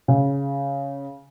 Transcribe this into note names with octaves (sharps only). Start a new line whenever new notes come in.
C#3